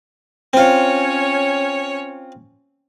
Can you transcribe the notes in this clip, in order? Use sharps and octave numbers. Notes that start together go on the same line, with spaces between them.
C4 C#4 F4 C#5